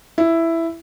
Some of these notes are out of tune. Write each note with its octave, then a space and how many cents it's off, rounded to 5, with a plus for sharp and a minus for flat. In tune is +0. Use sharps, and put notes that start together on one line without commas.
E4 +5